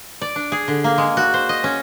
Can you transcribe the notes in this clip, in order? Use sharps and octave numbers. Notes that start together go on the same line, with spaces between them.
D5
D4
G#4
D3
A#3
G#3
F#4
C5
D#5
C#4